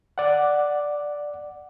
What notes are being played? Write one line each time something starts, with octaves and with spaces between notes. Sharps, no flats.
D5 F#5